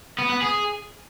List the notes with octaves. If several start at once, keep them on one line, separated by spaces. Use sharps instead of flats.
B3
B3
G#4